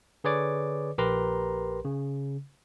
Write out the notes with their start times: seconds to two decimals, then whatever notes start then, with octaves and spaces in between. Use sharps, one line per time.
0.24 D3 G#4 B4 C#5 D5 D6
0.98 A#1 G4 A#4 B4 A#5 C6
1.85 C#3